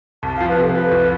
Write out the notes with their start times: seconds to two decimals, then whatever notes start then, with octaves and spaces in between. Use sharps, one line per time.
0.23 C2 A5
0.36 F5
0.41 F3
0.49 B4
0.57 C3 A4
0.74 F3 B4
0.91 C2